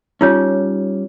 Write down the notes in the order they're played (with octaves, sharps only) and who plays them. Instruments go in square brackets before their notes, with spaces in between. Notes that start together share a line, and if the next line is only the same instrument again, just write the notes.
[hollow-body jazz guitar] G3 C#4 [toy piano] D#4 F4 C#5